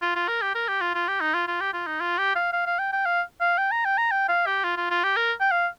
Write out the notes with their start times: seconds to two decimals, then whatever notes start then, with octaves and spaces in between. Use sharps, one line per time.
0.02 F4
0.16 F4
0.28 A#4
0.42 G4
0.55 A#4
0.68 G4
0.81 F4
0.95 F4
1.08 G4
1.21 D#4
1.34 F4
1.47 F4
1.60 G4
1.73 F4
1.87 D#4
2.01 F4
2.18 G4
2.35 F5
2.53 F5
2.66 F5
2.79 G5
2.92 G5
3.06 F5
3.40 F5
3.58 G5
3.72 A#5
3.85 G5
3.98 A#5
4.11 G5
4.29 F5
4.46 G4
4.64 F4
4.77 F4
4.90 F4
5.04 G4
5.17 A#4
5.40 G5
5.51 F5